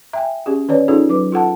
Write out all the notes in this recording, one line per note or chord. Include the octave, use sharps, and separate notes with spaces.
E5 G5 G#5
C#4 G4 G#4
D#3 C#4 B4 C#5 D5
C#4 D#4 F4 G#4 A4
F#3 B4 D6
F4 A4 F#5 A5